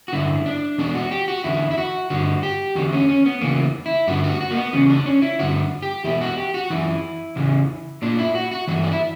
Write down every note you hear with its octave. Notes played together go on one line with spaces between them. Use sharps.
F#4
G2 D3 E4
D4
E2 B2 D4
F#4
G4
F#4
E2 D3 E4
E4
F#4
G2 D3 F#4
G4
E2 D3 F#4
C#4
C#4
B3
E2 C#3 E3 A#3
E4
G2 D3 F#4
F#4
F#4
A#3
B3
E2 C#3 C#4
D4
C#4
E4
G2 D3 F#4
G4
E2 B2 E4
F#4
G4
F#4
F#2 E3 E4
E2 C#3 E3
A#2 D4
E4
F#4
F#4
G2 E3 F#4
E4
D4
E4